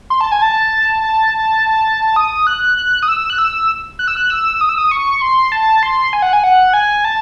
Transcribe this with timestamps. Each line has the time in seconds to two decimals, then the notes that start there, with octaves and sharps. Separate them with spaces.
0.10 C6
0.21 A5
0.32 G#5
0.42 A5
2.16 D#6
2.47 F#6
2.77 F#6
3.03 D#6
3.08 E6
3.30 F#6
3.38 E6
3.99 F#6
4.08 E6
4.16 F#6
4.30 E6
4.61 D#6
4.69 E6
4.78 D#6
4.91 C#6
5.22 C6
5.52 A5
5.83 C6
6.13 G#5
6.22 F#5
6.33 G#5
6.44 F#5
6.73 G#5
7.05 A5